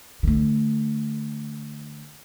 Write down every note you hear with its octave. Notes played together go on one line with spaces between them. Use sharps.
D3 A3